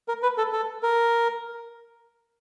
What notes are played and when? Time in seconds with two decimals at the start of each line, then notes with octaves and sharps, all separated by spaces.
0.08 A#4
0.23 B4
0.38 A4
0.53 A4
0.83 A#4